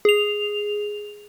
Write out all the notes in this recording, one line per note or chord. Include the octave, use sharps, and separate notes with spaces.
G#4 F7